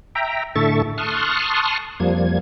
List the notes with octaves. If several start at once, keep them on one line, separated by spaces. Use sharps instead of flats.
E5 G5 A#5
A2 D3 A4 E5 C#6 A6
A5 C6 C#6 D#6 F6 F#6
F2 F3 G3 A#3 G#6